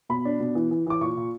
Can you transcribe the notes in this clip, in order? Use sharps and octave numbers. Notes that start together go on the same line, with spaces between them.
B2 B5
D4
B2
E3
E3
E3 D6
A#2 C#6
A#2